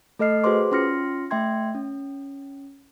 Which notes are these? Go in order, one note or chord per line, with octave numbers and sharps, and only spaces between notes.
A3 A4 D#5 F6 C7
F#4 G#4 B4 C5 C6 D6
C#4 F4 C6 F6 A#6 C#7
A3 E5 G5 C6 G#6
C#4